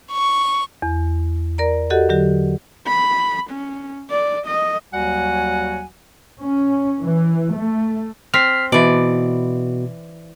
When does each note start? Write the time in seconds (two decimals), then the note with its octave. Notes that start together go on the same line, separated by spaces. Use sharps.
0.12 C#6
0.82 E2
1.58 A#4 D5 A#5
1.90 F#4 G4 A4 D#5 F#5
2.09 D3 F#3 G4
2.87 B5
3.50 C#4
4.11 D5
4.47 D#5
4.93 D#2 F#3 G3 F#4 F#5 G#5
6.39 C#4
7.02 E3
7.55 A3
8.34 C4 F6 B6 C7
8.72 B2 E3 D5